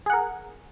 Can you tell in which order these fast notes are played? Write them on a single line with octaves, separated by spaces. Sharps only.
G#4 F#5 A#4